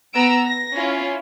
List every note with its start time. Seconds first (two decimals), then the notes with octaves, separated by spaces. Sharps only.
0.14 B3 A#5 E6 D7
0.44 A#6
0.75 C#4 E4 F4